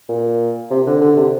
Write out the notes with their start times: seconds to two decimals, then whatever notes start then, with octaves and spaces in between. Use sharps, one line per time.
0.09 A#2
0.71 C3
0.86 D3
1.01 D3
1.16 C3